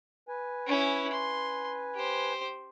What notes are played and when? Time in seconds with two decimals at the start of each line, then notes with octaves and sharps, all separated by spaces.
0.28 B4 G#5
0.67 C#4 E4
1.12 C6
1.95 G4 C5